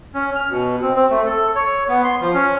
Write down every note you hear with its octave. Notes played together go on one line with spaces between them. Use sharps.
C#4
F6
B2
C4
C4
A3
A4
C#5
B3
C6
F3
C#4